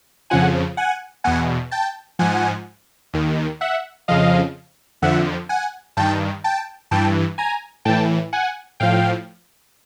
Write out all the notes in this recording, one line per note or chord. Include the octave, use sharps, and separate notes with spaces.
F2 C#3 F3 F#5 G#5
F#5 G#5
E2 B2 F#5 G#5
G5 A5
G#2 F3 F#5 G#5
D#2 D#3
E5 F#5
F2 C#3 F3 D#5 F5
F2 D3 F3 E5 F#5
F#5 G#5
G2 D#3 G5 A5
G5 A5
G2 E3 G5 A5
G#5 A#5
A2 E3 G5 A5
F#5 G#5
A2 F3 F5 G5